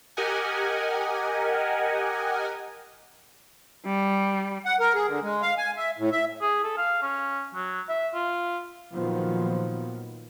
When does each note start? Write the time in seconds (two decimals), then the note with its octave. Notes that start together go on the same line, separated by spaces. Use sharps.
0.17 G4 A#4 D#5 F#5 G#5
3.86 G3
4.66 F#5
4.80 A#4
4.95 G#4
5.07 D3
5.22 G#3
5.42 F5
5.58 G#5
5.77 E5
5.98 A2
6.12 E5
6.41 G#4
6.63 A4
6.77 F5
7.02 C#4
7.54 F#3
7.88 E5
8.14 F4
8.93 A#2 D#3 F3 F#3 B3